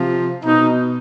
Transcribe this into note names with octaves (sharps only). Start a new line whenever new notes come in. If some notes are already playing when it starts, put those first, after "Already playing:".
Already playing: C3 F3
B2 D#4